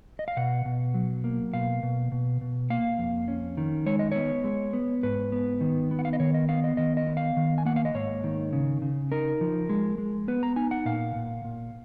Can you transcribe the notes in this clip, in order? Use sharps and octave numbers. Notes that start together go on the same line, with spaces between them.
D#5
F5
B2 F#5
B2
F#3
A#3
B2 F5
B2
B2
B2
A#3 F5
F2
C#4
D#3
G#3 C#5
D#5
B3 C#5
G#3
B3
G#2 B4
B3
D#3
B3
F#5
F5
D#5
D#3 C#5
D#5
B3 F5
D#5
D#3 D#5
D#5
B3
F5
D#3
G#5
A#3 F#5
F5
D#5
G#2 C#5
D#3
C#3
C#3
D#4 A#4
F3
G#3
G#3
B3 B4
A#5
D#4 G#5
F#5
A#2 F5
A#2
A#2